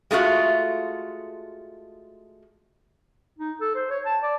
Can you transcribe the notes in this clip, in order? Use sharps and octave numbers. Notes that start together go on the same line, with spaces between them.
G#3 A3 F4 F#4
D#4
A4
C5
C#5
A5
D5